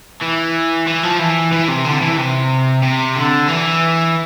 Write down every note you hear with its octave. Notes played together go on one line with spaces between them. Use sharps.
E3
E3
F3
E3
E3
C3
D3
E3
C3
C3
D3
E3